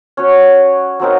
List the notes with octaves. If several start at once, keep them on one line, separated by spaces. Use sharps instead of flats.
C#4 F#4 C#5
F#3 C4 D#4 A#4